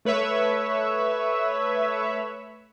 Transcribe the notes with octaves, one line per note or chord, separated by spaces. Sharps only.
A3 B4 C#5 E5